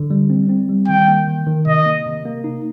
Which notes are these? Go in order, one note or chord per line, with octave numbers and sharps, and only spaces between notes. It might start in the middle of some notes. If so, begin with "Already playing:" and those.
Already playing: D3
G3
C4
C4
G3
D#3 G5
A#3
D#3
D#3
C3 D#5
A#3
C3
A#3
D#4